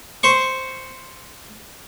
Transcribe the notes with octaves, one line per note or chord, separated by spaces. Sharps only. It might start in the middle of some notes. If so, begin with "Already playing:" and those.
C5 C#6